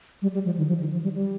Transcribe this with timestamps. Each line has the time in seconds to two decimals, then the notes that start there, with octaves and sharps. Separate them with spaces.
0.22 G3
0.34 G3
0.45 F3
0.58 D#3
0.68 F3
0.80 D#3
0.92 F3
1.03 G3
1.15 G3